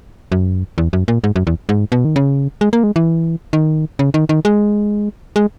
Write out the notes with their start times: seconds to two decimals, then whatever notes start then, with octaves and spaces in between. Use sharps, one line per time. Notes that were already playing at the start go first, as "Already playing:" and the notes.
0.32 F#2
0.78 E2
0.93 F#2
1.08 A#2
1.24 G#2
1.36 F#2
1.47 E2
1.69 G#2
1.92 B2
2.05 D#3
2.16 C#3
2.61 G#3
2.73 A#3
2.83 G#3
2.96 E3
3.53 D#3
3.99 C#3
4.14 D#3
4.29 D#3
4.45 G#3
5.36 G#3